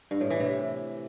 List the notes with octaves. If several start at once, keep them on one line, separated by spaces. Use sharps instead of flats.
G2
A2
E3
C3